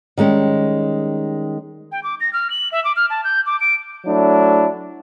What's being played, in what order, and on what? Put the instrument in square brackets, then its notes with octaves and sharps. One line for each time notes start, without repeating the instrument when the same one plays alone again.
[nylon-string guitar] D#3 G3 G#3 C#4
[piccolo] G5
D6
A#6
F6
F#7
E5
D6
F6
A5
G6
D6
D7
[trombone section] F#3 A3 D4 E4